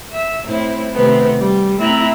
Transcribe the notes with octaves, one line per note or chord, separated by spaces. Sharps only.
E5 E6
A2 C4 E4
C3 D#3 A3 B3 C4
G3
A3 C4 E4 E5 A#5 F#6